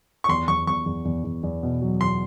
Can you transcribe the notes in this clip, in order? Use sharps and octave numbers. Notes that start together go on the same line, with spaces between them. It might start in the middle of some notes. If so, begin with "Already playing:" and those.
C#6
E2 C6
E2 C#6
E2 C#6
E2
E2
E2
E2
B2
F#3
E2 C6